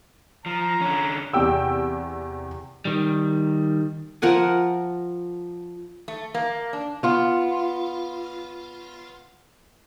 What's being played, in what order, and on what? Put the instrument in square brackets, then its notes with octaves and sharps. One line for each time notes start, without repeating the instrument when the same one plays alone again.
[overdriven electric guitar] F3 [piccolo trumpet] A#5
[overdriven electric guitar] D3 C#4
[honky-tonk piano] E2 C3 G4 G5 E6
[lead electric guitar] D#3 G3
[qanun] F3 A#4 F#5 G#5
[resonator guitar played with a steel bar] A3
A#3
D4
B3 F4